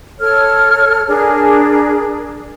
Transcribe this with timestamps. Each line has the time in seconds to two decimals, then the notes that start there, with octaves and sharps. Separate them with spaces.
0.20 A4 C#5 F6
1.07 D4 G#4 A#4